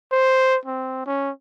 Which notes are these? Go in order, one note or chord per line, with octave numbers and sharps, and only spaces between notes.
C5
C4
C#4